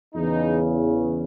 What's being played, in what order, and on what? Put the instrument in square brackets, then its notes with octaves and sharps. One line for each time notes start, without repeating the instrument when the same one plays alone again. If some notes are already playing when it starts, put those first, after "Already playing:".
[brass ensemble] E2 C#3 E3 D#4